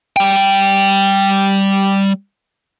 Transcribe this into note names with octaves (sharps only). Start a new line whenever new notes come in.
G3 G5